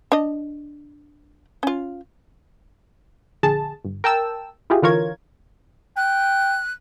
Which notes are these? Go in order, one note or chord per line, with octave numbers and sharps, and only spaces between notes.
D4 D#5
C#4 F4
A#1 D3 G#4 A5
G1
A#4 G5 A5 E6
E4 F4 G4 G#4
D3 E3 F4 A#4 C#5 G#6
G5 F#6